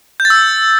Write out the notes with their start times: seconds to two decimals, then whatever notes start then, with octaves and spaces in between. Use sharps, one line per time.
0.20 G6
0.25 A6
0.30 E6